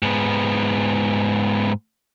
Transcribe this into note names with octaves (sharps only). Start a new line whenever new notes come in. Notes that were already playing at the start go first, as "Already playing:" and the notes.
G#2 B3